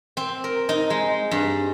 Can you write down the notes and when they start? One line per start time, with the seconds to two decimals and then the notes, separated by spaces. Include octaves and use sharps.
0.17 C4
0.44 A#4
0.69 D#4
0.90 G#3
1.31 G2